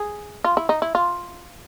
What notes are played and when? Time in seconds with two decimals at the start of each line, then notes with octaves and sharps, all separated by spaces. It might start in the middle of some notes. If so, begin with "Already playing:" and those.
Already playing: G#4
0.44 F4
0.57 E4
0.69 D#4
0.82 E4
0.95 F4